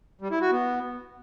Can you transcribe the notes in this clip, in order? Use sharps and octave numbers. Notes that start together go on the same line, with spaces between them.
G3
E4
F#4
B3